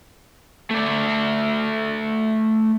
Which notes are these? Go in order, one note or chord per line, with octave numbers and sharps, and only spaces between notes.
A3 D5